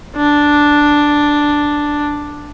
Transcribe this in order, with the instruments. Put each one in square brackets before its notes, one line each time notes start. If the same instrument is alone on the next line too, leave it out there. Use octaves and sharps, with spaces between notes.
[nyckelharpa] D4